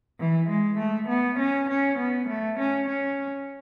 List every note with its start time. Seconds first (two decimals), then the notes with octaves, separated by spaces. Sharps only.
0.20 E3
0.49 G#3
0.79 A3
1.09 B3
1.39 C#4
1.69 C#4
1.99 B3
2.29 A3
2.60 C#4
2.89 C#4